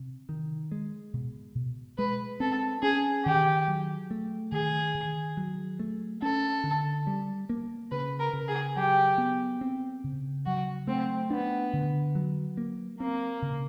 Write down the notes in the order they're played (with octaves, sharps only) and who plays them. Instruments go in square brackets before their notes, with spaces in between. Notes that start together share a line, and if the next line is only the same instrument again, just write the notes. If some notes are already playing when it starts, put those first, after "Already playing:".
Already playing: [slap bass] C3
D#3
G#3
B2
B2
[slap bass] G#3 [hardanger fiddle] B4
[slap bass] C4 [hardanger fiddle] A4
[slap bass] C#4 [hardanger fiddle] G#4
[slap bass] D#3 [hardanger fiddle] G4
[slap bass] F#3
A3
[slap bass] D#3 [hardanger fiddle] G#4
[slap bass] D#3
F#3
A3
[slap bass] C#4 [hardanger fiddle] A4
[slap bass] D3
G3
A#3
[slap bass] C#3 [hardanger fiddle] B4
[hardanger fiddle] A#4
[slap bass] C#3
[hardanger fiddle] G#4
[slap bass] F#3 [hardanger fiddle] G4
[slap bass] B3
C4
C#3
[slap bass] F#3 [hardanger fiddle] F#4
[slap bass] A3 [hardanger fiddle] C4
[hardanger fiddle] B3 [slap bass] D4
[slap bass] D3
F#3
A#3
[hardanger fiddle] A#3 [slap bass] C4
[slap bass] C#3